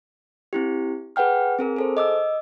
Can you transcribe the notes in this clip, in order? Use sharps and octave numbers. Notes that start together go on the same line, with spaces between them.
C4 E4 G4
G#4 B4 F#5 G5 F6
C4 G#4 A#4
G#4 A4 C5
D#5 D6 E6